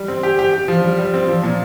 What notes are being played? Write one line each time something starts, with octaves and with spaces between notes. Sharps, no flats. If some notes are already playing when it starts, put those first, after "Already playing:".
Already playing: G3
C4
G4
G4
G4
F3
G3
G3
C4
F3
A#2